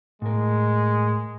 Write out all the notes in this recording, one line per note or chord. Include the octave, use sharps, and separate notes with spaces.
A2 G#3 A#4